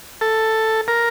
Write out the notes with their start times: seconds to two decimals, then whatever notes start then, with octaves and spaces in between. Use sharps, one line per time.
0.21 A4
0.88 A#4